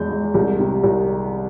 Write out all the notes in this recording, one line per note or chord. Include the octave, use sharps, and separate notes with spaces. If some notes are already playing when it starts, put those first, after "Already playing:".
Already playing: E2 E3 G#3 G6
G#3
C2
C3
C2